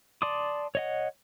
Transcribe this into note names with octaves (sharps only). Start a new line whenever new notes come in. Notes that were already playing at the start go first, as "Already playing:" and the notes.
D5 A5 C6 D6 D#6
C#5 D#5 F#5